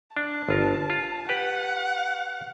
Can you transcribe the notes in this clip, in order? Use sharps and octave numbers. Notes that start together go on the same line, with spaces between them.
D4 A5
G1 F4 A#4
F4
G4 B4 F#5